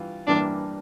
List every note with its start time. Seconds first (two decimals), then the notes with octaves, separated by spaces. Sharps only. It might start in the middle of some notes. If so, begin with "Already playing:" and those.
Already playing: G2 E3 F4
0.27 A1 G2 E3 A#3 D4 E4